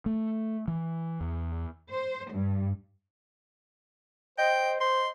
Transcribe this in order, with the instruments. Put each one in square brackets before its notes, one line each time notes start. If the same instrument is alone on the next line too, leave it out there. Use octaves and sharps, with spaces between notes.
[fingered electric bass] A3
E3
E2
[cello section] C5
G2
[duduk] C5 [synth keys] D#5 [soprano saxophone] G5
[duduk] C5 [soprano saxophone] C6